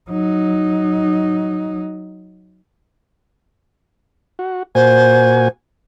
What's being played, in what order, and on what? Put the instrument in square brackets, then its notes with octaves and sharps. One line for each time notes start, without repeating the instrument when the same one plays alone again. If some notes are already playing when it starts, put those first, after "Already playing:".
[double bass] F#3 D#4
[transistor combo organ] F#4
[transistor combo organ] A#2 F#4 G#5 [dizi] C5